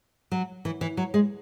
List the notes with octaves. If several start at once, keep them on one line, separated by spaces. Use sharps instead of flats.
F#3
E3
E3
F#3
G#3